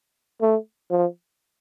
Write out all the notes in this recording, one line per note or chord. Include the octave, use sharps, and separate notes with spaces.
A3
F3